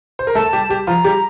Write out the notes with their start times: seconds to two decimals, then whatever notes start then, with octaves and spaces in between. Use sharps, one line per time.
0.19 C5
0.27 A#4
0.35 A3 A4 A5
0.53 G3 G4
0.70 G3 G4
0.87 F3 F4 A#5
1.04 G3 G4